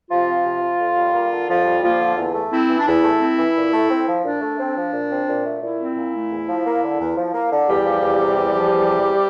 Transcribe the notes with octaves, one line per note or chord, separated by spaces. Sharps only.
C3 F3 F4
C4
C3
F3
F2
G3
A#3
D3
F2 F3 F4
G3
F3 A#3 F4
D3
E2
A3
C4 E4
E3
D4
E2 E4
A3
C4
E3
A#2
A3
C4
F3
A#2 D4
A3
C4
F3
A#2
C4
A#2
A3
A#2 E4
C4
A#2
A3
E2
F3
A#3
D3
E2
F3
A#3
D3
E2 G3 G4
F3
E2
C3
E2
F3
E2
C3
C3